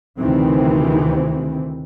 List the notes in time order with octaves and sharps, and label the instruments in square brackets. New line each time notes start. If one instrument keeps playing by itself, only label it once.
[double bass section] D2 C3 D#3 E3 C4